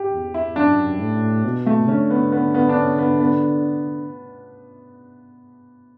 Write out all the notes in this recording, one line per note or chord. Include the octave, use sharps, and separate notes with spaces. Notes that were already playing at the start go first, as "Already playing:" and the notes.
Already playing: G4
E2
E4
F#2 D4
A2
B2
A3
D3 C#4
B3
B3
B3
D4
C#4
B3
B3